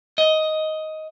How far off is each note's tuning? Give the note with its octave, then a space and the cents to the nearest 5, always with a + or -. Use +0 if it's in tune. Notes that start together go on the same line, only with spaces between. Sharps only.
D#5 +10